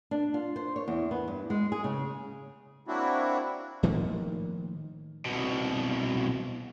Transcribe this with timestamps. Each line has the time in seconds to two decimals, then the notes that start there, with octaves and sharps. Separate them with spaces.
0.11 D4
0.34 F4
0.56 C5
0.76 C#5
0.88 E2
1.11 B3
1.28 G2
1.50 G#3
1.72 G#4
1.84 C#3
2.88 F#3 A#3 C4 D4 E4 F#4
3.83 A2 D#3 F3 A#3
5.26 C2 B2